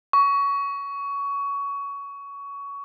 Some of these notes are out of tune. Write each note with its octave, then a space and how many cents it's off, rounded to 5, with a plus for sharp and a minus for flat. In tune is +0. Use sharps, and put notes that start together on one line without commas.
C#6 +20